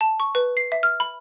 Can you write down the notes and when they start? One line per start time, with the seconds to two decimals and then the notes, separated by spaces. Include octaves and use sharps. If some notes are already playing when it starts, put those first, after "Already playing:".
0.01 A5
0.20 C#6
0.35 B4
0.57 C7
0.72 E5
0.83 F6
1.00 B5